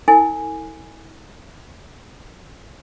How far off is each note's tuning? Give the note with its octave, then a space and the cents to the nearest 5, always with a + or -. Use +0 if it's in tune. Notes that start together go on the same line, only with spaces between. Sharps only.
E4 -35 A4 +35 G#5 -5